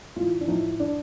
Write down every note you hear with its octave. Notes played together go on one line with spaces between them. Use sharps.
A1 F4
D4
A2 F3 D#4
D4